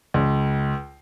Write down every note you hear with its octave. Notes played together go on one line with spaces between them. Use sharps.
C#2